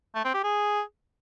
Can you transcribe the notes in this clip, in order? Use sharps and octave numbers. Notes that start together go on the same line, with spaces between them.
A3
C4
G4
G#4